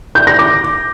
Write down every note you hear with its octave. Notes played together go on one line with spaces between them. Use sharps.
G6
A#6
D6